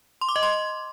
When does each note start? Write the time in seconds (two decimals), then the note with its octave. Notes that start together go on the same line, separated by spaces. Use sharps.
0.21 C6
0.29 D6
0.36 D#5
0.43 C6